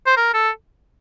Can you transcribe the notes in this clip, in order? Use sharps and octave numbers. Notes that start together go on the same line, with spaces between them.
C5
A#4
A4